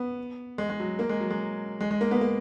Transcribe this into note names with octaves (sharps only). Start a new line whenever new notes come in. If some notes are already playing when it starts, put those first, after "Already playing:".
Already playing: B3
G#3
G#3
F#3
A#3
G#3
F#3
G#3
G#3
G#3
A#3
B3
A#3